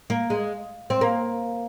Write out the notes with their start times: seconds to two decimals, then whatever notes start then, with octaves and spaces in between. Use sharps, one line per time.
0.10 A#3
0.30 G#3
0.90 C4
1.01 A#3